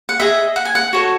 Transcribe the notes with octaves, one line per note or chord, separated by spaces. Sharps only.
F#5
G#4 D#5 E5
F#5
G#5
F#5
F#4 A4 C#5